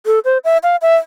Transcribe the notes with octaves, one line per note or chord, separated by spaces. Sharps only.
A4
C5
E5
F5
E5